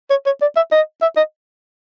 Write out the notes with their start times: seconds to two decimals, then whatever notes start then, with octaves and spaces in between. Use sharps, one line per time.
0.10 C#5
0.26 C#5
0.41 D5
0.56 E5
0.71 D#5
1.02 E5
1.17 D#5